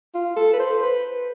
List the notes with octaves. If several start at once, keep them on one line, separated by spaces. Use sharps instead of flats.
F4
A4
B4
C5
B4